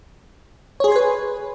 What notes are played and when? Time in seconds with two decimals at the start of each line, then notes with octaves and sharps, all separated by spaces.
0.80 C#5
0.84 G#4
0.88 C6
0.92 G#5
0.96 B4